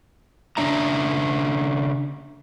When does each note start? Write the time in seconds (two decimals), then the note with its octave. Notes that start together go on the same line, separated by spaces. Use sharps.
0.57 C#3 G3 D4 E5 A#5